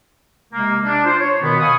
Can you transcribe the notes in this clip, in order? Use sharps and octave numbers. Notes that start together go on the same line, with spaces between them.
C3 G#3 A#3
D4
F4 C5
C#5
B2 D#3 B3
F5 G#5 B5 C#6 D#6